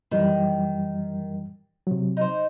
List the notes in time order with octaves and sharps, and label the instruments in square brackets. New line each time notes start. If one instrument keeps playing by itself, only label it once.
[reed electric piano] F#2 E3 G3 [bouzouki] D#3
[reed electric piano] C3 F#3
[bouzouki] D#4 C5